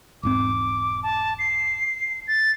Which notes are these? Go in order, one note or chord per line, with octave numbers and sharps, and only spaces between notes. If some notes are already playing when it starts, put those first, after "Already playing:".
E1 G#2 C4 D6
A5
C7
A6